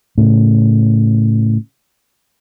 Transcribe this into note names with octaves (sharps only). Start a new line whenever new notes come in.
A2 C#3